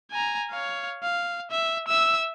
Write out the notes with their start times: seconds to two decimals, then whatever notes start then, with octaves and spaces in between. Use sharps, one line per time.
0.11 G#5 A#5
0.50 C#5 F5
1.03 F5
1.51 E5
1.88 E5 E6